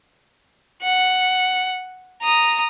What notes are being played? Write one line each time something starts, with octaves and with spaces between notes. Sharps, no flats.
F#5
A#5 D#6